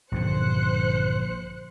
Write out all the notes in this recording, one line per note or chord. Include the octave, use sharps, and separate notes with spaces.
A#1 G2 D3 C5 F#6 C#7